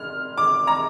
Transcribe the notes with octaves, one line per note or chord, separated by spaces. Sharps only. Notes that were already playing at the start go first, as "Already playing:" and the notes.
Already playing: F6
D6
A#5